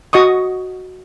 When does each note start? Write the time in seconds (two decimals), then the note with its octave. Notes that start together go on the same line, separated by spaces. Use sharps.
0.13 F#4 D#5 C#6 D#6